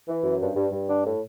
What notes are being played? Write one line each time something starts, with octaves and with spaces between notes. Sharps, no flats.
E3
F#2
G2
G2
G2
D4
A2